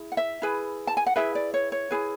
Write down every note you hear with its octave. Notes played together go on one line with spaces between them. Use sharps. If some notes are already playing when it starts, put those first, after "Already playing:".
Already playing: E4 G#4
F#5
E5
E4 G#4 B4
A5
G#5
F#5
E4 G#4 B4 E5
D5
C#5
C#5
E4 G#4 B4